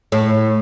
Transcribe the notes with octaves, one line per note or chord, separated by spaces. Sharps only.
A2